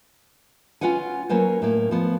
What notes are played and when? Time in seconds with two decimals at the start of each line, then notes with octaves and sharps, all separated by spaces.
0.81 C#4 F4 B4 F#5 G#5
1.29 F#3 A#3 C#4 B4 C5
1.62 A2 A#3
1.91 F3 B3